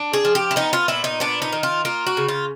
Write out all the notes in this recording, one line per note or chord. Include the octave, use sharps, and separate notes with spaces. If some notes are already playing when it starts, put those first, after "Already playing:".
Already playing: D4
G#4
F3
G4
E4
B3 D#4
F4
A#2 E4
D#4
B3 D4
D#4
D#3
F4
A#3 F4
F#4
C#3
F4